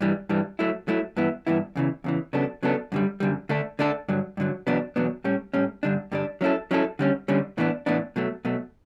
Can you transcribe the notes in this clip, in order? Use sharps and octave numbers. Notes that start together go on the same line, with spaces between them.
G2 E3 G3
G2 E3 G3
F#3 A3 E4
F#3 A3 E4
G2 E3 B3 E4
G2 E3 B3 E4
E2 C#3 E3
E2 C#3 E3
C#3 F#3 B3 D4 A4
C#3 F#3 B3 D4 A4
F#2 D3 G3
F#2 D3 G3
D3 A3 D4 A4
D3 A3 D4 A4
G2 D3 F#3
G2 D3 F#3
E2 B2 F#3 B3 D4
E2 B2 F#3 B3 D4
A2 G3 C#4
A2 G3 C#4
G2 D3 G3 D4
G2 D3 G3 D4
F#3 C#4 E4 A4
F#3 C#4 E4 A4
D3 G3 C#4
D3 G3 C#4
A2 E3 B3 D4
A2 E3 B3 D4
B2 F#3 A3
B2 F#3 A3